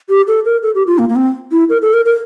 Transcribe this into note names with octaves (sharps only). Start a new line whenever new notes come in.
G4
A4
A#4
A4
G4
F4
A#3
A#3
C4
E4
A#4
A4
A#4
A#4